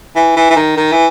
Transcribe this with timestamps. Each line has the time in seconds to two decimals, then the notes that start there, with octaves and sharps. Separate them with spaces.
0.16 E3
0.36 E3
0.50 E3
0.56 D#3
0.77 D#3
0.92 E3